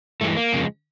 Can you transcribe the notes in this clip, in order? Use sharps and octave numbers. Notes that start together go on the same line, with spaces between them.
G2 E3 G#3 A3
A#3
F2 C#3 F3 G#3